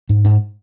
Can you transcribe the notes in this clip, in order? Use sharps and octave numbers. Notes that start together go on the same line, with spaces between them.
G#2
G#2